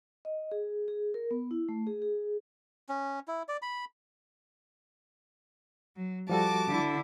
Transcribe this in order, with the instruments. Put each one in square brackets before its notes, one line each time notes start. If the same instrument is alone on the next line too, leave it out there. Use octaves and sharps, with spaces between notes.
[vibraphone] D#5
G#4
G#4
A#4
B3
E4
A3
G#4
G#4
[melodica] C#4
E4
D5
B5
[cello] F#3
[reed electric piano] F3 G3 A4 [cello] F#4 [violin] A5 D6
[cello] D3 E4